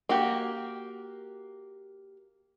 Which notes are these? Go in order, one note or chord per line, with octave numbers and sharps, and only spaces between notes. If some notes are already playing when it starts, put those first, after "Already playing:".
A#3 F#4 G4